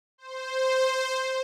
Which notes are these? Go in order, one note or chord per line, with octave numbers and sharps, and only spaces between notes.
C5